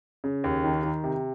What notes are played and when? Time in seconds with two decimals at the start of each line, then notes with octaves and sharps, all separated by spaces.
0.24 C#3
0.44 D#2
0.64 D#3
0.83 D#3
1.04 C3